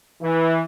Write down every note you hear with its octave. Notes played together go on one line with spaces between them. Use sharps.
E3